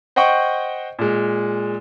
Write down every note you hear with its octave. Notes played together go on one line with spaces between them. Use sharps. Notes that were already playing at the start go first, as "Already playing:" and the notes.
C5 D#5 F#5 G5 C#6
A#2 G#3